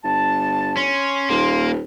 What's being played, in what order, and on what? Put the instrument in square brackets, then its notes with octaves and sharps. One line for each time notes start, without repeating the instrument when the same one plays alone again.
[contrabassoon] G1 [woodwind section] A5
[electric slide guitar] C#4 [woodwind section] C6
[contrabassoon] D#1 [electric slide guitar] A#3